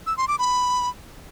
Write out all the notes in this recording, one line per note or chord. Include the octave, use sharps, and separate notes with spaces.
E6
C6
D6
B5